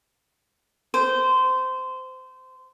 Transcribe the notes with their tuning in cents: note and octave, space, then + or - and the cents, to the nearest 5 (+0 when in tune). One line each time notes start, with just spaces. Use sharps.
C5 -20